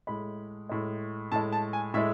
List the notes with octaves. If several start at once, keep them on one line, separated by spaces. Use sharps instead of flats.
A2 G#3 B5
A2 G#3
A2 G#3 A5
A5
G#5
A2 G#3 E5